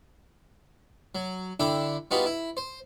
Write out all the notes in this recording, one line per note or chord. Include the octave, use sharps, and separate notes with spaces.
F#3
D3 D4 E4 G5
G3 B3 D#4 F4 F#4
E4
C5